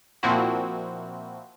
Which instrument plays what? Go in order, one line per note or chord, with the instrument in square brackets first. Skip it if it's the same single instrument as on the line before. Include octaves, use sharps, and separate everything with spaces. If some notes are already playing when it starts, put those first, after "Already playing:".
[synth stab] A#2 F3 A#3 C4 E4 F#4